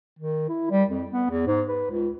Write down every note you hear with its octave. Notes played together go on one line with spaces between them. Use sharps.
D#3
E4
G3
F2
B3
E2
G#2
B4
C#2